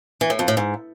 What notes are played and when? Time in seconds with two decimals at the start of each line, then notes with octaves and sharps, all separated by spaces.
0.21 E3
0.30 A2
0.39 F2
0.48 A2
0.57 G#2